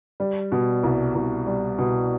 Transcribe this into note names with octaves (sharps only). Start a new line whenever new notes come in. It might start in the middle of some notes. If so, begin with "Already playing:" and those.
G3
B2
C2
C2
G3
B2